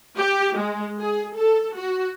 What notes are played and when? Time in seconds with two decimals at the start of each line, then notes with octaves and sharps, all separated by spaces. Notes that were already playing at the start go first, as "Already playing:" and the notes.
0.17 G4
0.57 G#3
0.99 G#4
1.37 A4
1.75 F#4